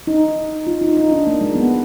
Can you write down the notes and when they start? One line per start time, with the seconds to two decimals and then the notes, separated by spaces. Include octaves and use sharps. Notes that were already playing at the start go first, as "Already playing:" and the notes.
0.07 D#4
0.67 F4
0.81 D#4
0.97 D#4
1.11 D4
1.27 A#3
1.41 G#3
1.56 B3